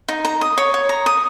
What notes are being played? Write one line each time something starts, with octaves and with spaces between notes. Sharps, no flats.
D#4
A#5
D#6
C#5
C#5
A#5
D#6